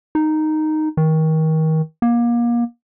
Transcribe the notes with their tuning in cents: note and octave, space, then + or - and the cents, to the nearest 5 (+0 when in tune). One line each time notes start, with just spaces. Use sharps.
D#4 -5
D#3 +30
A#3 +30